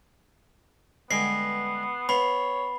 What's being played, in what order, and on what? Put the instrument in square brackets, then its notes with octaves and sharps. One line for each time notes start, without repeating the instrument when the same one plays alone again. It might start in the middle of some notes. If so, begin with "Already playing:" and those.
[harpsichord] G2 D3 G#3 [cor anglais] B3 [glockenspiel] C7
[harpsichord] B3 F5 [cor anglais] C#5 [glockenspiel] B5